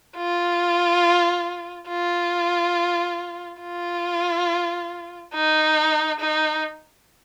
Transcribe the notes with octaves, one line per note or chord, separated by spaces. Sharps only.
F4
F4
F4
D#4
D#4